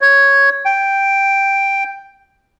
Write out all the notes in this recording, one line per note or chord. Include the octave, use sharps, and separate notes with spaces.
C#5
G5